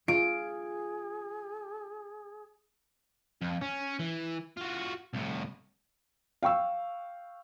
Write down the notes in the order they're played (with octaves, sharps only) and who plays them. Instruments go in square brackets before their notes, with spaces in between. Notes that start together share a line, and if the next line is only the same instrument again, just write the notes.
[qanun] F4 [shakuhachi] G#4 [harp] D7
[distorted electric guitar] F2
C#4
E3
F4 F#4
C2 A2
[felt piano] F5 G5 C#6 E6